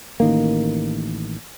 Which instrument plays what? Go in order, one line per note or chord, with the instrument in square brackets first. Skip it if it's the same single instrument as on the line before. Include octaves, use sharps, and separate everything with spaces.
[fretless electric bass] A1 D#3 A#3